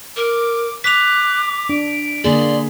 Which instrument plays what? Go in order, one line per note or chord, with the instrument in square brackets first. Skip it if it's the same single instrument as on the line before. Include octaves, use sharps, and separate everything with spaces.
[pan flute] A#4 [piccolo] D6
[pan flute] D6 [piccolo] F#6 [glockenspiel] B6 F7
[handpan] D4 [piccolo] D7
[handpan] D3 A#3 G#4 [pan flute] D5 [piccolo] C6